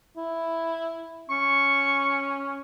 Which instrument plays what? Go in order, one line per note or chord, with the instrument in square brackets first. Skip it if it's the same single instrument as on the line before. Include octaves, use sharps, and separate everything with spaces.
[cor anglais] E4
[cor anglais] C#4 [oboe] C#6